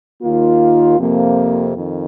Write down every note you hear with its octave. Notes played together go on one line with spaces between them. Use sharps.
D#2 D#3 A#3 F4
F2 C3 F3 A#3
F2 D#3